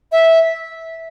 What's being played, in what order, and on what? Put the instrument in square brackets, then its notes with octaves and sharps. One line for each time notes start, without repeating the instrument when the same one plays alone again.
[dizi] E5